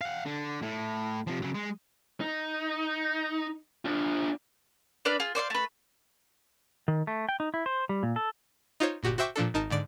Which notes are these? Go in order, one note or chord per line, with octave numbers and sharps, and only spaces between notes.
F5 F#5
D3
A2
C3 F3
C#3 F#3
G#3
D#4
D4 F4
D4 B4 D5 F5
F4 G#4
C5 D5 E5 F5
A3 B4
D#3
A3
G5
D#4
E4
C5
G3
A#2
A4
D#4 F4 C5 C#5
G1 A#2 F#4 G4
F#4 C5 E5 G5 C#6 D6
A#2 F3 D4 A4
G#1 D#4 A#4 A5
G#2 D3 D5 D7